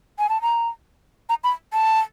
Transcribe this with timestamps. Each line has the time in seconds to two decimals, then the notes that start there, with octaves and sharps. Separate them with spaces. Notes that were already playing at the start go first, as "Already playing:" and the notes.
0.19 G#5
0.29 A5
0.42 A#5
1.29 A#5
1.44 B5
1.73 A5